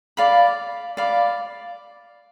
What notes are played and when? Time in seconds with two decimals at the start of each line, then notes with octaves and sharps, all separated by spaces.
0.17 D5 F5 B5
0.97 D5 F5 B5